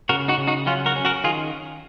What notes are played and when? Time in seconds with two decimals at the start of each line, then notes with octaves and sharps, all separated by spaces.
0.09 C#3 F#4 A#4
0.28 D#4 F#4
0.38 C#3
0.48 D#4 F#4
0.66 F#3 C#4 F4
0.86 F#4 A#4
0.96 C#4
1.05 F#4 A#4
1.24 D#3 F4 G#4